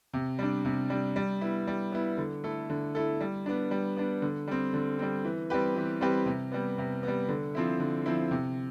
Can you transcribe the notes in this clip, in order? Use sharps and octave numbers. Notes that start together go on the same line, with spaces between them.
C3
G3 D4
C3
G3 D4
G3
B3 E4
G3
B3 E4
D3
A3 E4 A4
D3
A3 E4 A4
G3
B3 D4
G3
B3 D4
D3
G3 C4
D3
G3 C4
E3
G3 C4 G4 B4
E3
G3 C4 G4 B4
C3
G3 B3
C3
G3 B3
D3
F3 C4 E4
D3
F3 C4 E4
C3